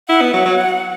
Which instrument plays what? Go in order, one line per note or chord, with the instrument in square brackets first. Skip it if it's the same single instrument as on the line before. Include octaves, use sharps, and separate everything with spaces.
[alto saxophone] E4 [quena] F#5
[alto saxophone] B3
F#3
F#3